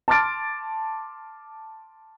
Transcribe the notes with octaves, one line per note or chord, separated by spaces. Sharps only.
A5 C6 D6 F6 A6 D7